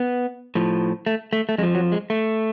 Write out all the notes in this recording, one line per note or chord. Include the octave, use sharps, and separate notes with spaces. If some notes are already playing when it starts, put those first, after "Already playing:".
Already playing: B3
A2 F3
A3
A3
A3
F2 F3 G#3
F#3
G#3
A3